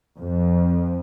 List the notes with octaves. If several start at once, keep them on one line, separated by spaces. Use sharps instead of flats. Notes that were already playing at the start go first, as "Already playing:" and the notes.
F2